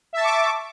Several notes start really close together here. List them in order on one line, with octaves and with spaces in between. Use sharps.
E5 A5 C#6 D6